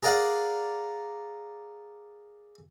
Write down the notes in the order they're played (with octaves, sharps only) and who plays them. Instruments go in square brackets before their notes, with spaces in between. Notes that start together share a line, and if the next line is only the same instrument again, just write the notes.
[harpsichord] G#4 A#4 D5 F5 F#5